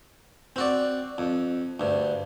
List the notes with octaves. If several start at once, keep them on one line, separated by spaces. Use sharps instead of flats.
C4 F#4 D5
F2
D2 G2